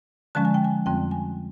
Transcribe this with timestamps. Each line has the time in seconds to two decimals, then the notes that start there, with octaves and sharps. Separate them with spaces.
0.35 D3 F3 G#3 C#4 A5
0.45 G#5
0.54 G5
0.65 G#5
0.86 F2 D3 G3 C4 G5
1.11 G#5